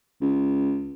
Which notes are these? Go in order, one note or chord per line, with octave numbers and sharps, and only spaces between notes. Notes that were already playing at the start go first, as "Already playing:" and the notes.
C#2